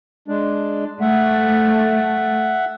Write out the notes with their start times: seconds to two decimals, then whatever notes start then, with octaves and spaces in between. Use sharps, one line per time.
0.28 G#3 D4
1.01 A3 E5 F#5